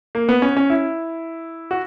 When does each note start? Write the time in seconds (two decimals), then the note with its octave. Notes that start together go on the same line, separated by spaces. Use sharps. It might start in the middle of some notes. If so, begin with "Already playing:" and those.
0.15 A#3
0.29 B3
0.42 C#4
0.57 C#4
0.70 E4
1.71 F#4